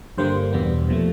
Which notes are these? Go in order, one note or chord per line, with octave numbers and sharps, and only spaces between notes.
G2 D3 G3 A#3 C5
E2 B2 G3 B3
A#2 F3 A3